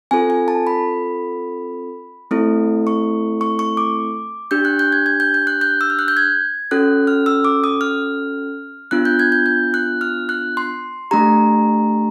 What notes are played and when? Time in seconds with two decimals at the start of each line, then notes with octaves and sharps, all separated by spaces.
0.11 C4 F4 A4 G#5
0.30 G#5
0.48 A5
0.67 B5
2.31 A3 C4 E4 A4
2.87 C#6
3.41 C#6
3.59 C#6
3.77 D6
4.51 D4 G4 G6
4.65 F#6
4.79 G6
4.92 G#6
5.06 G#6
5.20 G6
5.34 G6
5.47 F#6
5.61 G6
5.81 E6
5.90 F6
5.99 F#6
6.08 G6
6.17 G#6
6.71 C#4 F#4 A4 F#6
7.07 F6
7.26 E6
7.45 D6
7.64 D#6
7.81 F6
8.91 B3 D4 F4 F#6
9.05 G6
9.19 G#6
9.32 G6
9.46 G6
9.74 F#6
10.01 F6
10.29 F#6
10.57 C6
11.11 A3 D4 G4 A#5